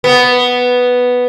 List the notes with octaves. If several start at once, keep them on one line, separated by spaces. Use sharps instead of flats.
B3